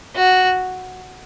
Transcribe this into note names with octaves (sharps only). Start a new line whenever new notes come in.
F#4